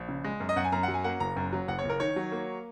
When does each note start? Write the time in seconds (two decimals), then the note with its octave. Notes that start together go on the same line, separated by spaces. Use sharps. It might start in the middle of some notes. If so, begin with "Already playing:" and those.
Already playing: A#1
0.09 C#3
0.24 G#3
0.40 F#2
0.49 D#5
0.56 F#2 F#5
0.64 G#5
0.72 F#2 A#5
0.83 F#5
0.88 F#3
0.94 G#5
1.04 A#3 F#5
1.20 F#1 A#5
1.36 F#2
1.53 F#3
1.68 F#1 F#5
1.79 C#5
1.85 F#1 A#4
2.00 D#3 C#5
2.16 F#3
2.32 A#3